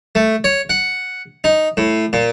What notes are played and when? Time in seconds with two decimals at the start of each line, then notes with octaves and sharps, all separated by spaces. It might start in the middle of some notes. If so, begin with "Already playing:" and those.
0.15 A3
0.44 C#5
0.69 F#5
1.44 D#4
1.77 A2
2.13 A#2